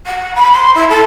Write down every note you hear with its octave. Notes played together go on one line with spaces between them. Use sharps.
F#5
B5
C6
E4
A4